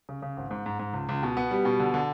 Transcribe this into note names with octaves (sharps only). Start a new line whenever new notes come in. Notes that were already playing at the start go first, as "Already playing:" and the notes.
C#3
C#3
G#1
G#2
G#2
G#2
C#2
C#2
B2
B3
G3
B2
D3
D3